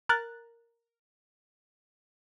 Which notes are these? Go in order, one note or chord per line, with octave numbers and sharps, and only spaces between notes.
A#4 F#6 A6